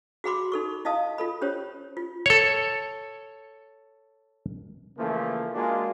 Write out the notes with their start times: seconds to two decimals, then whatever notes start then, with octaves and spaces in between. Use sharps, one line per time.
0.24 F#4 G#4 F#5 B5 C6 D6
0.52 D#4 A4 C#6
0.85 E4 D#5 F5 A5 D#6
1.18 F4 A4 B5
1.42 C#4 G4 C5 C#5
1.97 F4
2.26 A4 C#5
4.98 C#3 E3 F3 A3 A#3
5.54 G#3 A#3 D4 F4 F#4 G#4